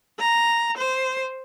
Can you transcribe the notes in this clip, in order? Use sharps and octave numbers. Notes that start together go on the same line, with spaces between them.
A#5
C5